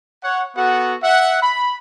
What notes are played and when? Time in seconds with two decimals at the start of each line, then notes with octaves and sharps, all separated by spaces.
0.24 C#5 F#5
0.57 B3 F#4 A4 F#5
1.03 E5 F#5
1.42 B5